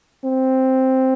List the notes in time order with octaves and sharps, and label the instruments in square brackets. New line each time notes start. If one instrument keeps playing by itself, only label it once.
[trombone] C4